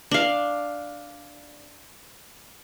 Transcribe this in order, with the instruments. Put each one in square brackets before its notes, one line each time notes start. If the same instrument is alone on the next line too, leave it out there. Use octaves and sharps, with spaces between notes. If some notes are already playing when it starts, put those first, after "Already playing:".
[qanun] D4 F5